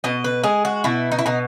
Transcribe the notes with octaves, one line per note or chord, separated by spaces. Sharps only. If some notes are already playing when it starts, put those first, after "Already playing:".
B2 D#5
B4
G#3 G#4
F#4
B2 E4
D#4
E4
B2 D#4